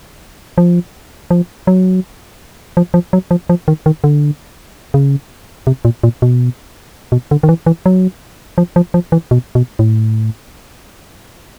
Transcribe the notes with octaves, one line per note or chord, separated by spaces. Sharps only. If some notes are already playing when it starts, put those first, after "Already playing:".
F3
F3
F#3
F3
F3
F#3
F3
F3
D#3
D#3
D3
C#3
C3
A#2
A#2
B2
B2
D3
D#3
E3
E3
F#3
F3
F3
F3
E3
B2
B2
A2